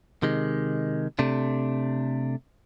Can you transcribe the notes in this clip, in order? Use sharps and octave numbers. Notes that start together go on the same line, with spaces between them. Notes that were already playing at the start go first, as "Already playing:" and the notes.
C3 D#3 G#3
C3 A3 D4